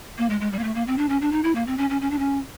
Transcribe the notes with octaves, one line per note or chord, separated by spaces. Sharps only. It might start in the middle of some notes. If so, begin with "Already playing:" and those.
A#3
G#3
G#3
G3
A#3
A3
A#3
C4
D4
C#4
D4
D#4
E4
A#3
C4
C#4
C#4
C#4
D4
C#4